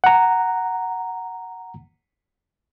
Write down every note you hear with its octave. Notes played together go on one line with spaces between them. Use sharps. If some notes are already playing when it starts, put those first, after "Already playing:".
F#5 A#5